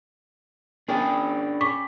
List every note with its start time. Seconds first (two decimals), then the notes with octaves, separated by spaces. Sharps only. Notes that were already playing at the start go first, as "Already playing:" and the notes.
0.88 C#4 D4 G#4 A#4 G5 B5
1.61 C#4 C#6 D6 B6